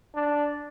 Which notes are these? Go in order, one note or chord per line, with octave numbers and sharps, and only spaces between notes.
D4